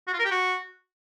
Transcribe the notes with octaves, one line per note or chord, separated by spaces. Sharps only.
F#4
F4
A#4
G4
F#4